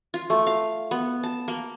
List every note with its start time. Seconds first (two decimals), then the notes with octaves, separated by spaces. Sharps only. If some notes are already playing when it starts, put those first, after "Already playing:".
0.14 F4
0.30 A3
0.47 F5
0.91 B3
1.23 A5
1.48 A#3